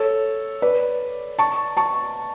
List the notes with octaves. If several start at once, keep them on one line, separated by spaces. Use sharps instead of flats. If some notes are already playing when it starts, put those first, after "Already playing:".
Already playing: A4 C#5
B4 D5
A5 C#6
A5 C#6